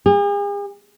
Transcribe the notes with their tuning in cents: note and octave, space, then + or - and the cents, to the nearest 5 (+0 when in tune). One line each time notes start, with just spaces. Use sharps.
G#4 -45